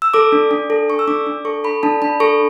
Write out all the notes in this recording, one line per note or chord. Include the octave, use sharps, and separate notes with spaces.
E6
A4 D6
D4
D4
A4
A4 C#6
E6
D4 D6
D4
A4 C#6
A4 B5
D4 A5
D4 B5
A4 C#6